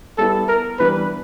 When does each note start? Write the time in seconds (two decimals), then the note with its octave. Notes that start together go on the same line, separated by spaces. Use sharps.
0.18 G3 B3 E4 G4 A4
0.49 A#4
0.79 E3 G3 B3 D4 B4